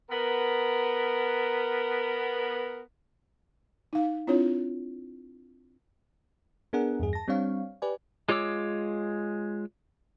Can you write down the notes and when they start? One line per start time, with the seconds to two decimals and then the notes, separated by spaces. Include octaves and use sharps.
0.11 B3 A#4
3.93 D#4 F5
4.27 C4 D4 E4 F4 C#5
6.73 B3 D4 G#4 A#4 F#5
7.00 E2 G2 G#4
7.13 A5 A#6
7.28 G3 C4 D4 C#5 F5
7.82 G4 B4 D5 G#5
8.29 G#3 F4 C#5 D6 E6